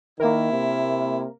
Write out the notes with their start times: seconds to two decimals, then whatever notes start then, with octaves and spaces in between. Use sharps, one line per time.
0.20 D#3 A#3 E4 A#4
0.52 C3